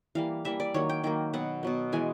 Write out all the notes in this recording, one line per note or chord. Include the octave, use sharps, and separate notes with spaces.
E3 G3 A#3 F5
E3 G3 A#3 E5
D5
D#3 F#3 A#3 C#5
G5
D#3 F#3 A#3 G5
B2 F#3 B3 F#5
B2 F#3 B3
E3 G#3 B3 G#5